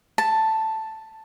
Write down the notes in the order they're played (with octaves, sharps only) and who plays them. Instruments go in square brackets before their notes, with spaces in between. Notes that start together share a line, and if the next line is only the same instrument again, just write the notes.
[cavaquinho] A5